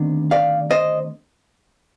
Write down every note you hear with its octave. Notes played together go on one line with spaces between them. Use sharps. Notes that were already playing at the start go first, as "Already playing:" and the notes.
Already playing: D2 C3 D#3 B3 D4
D5 F5
C5 D#5